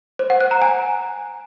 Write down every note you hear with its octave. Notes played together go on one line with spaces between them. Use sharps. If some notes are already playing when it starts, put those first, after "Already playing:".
C5
F#5
F#6
A#5
G#5